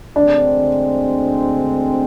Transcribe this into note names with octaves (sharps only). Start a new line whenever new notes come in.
D2 D3 G#3 C4 D4